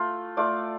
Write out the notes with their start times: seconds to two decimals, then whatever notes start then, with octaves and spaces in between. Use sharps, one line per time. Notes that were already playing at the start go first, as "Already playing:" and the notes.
Already playing: A3 F4
0.37 A3 F4 D5